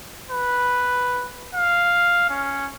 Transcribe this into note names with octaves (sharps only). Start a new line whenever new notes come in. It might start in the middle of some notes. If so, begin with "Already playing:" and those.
B4
F5
C#4